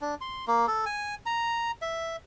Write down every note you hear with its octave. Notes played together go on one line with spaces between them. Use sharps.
D4
C6
A#3
A4
G#5
A#5
E5